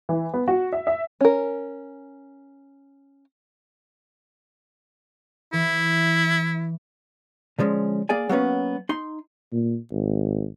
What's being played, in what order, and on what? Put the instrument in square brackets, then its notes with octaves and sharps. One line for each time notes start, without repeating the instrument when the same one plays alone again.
[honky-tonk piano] E3
B3
F#4
E5
E5
[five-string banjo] C#4 A#4
[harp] E3 [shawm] E4
[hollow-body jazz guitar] D3 F3 G#3 C#4
A#3 G#4 D5 G#5
F#3 A#3 B3 C#4
D#4 C6
[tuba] A#2
G#1